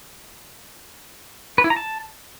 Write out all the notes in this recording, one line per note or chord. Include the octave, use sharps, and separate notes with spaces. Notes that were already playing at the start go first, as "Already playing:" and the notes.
B4
E4
A#5
A5